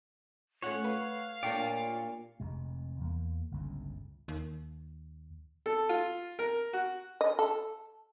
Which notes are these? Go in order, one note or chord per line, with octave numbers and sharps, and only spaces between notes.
A3 C#4 F4 C#5 F#5
B4 F5
A#2 A#3 D4 F4 G4 C#5 D5
F1 C3 G#3
E2 A#3
G1 C#2 A2
D#2
A4
F4
A#4
F#4
D#5
A4